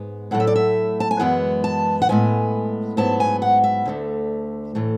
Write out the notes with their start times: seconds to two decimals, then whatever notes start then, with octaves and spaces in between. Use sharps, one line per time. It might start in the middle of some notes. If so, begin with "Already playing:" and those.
Already playing: G#2 G#3 B3
0.31 A2 F#3 A3 F#5
0.40 E5
0.47 D5
0.56 E5
1.00 A5
1.11 G#5
1.20 F#2 E3 G#3 B3 F#5
1.64 A5
2.02 F#5
2.09 A2 G#3 B3 G#5
2.97 G#2 F#3 B3 A5
3.20 G#5
3.42 F#5
3.64 E5
3.85 D2 D3 A3
4.75 A2 E3 A3